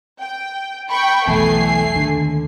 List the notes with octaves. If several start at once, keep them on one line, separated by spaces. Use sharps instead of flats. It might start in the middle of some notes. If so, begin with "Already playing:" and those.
G5
G5 B5 C#6
B1 E2 A3 G#5 C7
D#2 D3